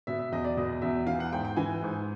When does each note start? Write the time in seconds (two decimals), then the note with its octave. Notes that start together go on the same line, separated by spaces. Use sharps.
0.07 B2 E5
0.19 E5
0.32 E2 D#5
0.44 D5
0.57 B2 D#5
0.82 E2 E5
1.06 E3 F5
1.20 F#5
1.32 G#2 G5
1.45 G5
1.56 E3 G#5
1.83 G#2